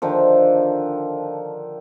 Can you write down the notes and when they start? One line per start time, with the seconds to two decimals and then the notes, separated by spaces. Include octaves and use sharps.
0.02 D3 D#3 F3